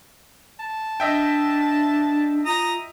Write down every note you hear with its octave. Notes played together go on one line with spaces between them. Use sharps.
A5
D4 D#5 E5 G5
F4 A#5 D#6